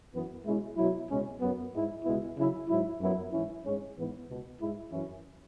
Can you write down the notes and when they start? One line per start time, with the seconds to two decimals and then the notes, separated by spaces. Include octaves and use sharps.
0.13 F#2 E3 B3
0.45 B2 G#3 C#4 E4
0.77 B2 F#3 E4
1.10 C#2 B2 G#3 C#4
1.41 F#2 F#3 B3
1.73 G#2 G#3 E4
2.04 C#2 B2 G#3 B3 E4
2.36 C#3 F#3 E4
2.68 G#2 F#3 E4
3.00 F#2 F#3 B3 E4
3.32 G#2 E3 C#4 E4
3.64 G#2 G#3 C#4
3.97 G#2 E3 B3
4.28 C#2 B2 B3
4.60 G#2 G#3 E4
4.91 F#2 E3 C#4 E4